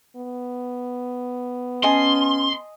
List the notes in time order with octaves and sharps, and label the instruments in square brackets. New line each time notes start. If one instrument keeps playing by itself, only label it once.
[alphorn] B3
[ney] C#4 [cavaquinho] D#5 G#5 A5 [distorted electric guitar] C6